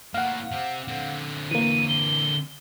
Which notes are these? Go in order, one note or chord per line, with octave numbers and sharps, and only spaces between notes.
A2 A#3 F5 F#5
C3 C4
D3 C4
E3 A#3 D#7
G7